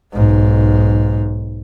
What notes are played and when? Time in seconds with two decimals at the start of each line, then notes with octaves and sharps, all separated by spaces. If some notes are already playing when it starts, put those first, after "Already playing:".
0.13 B1 G#2